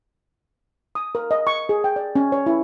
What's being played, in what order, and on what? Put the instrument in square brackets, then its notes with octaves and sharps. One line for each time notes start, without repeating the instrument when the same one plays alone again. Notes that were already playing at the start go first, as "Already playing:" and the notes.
[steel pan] D#6
A#4
D#5
C#6
G#4
G5
D5
C#4
C#5
E4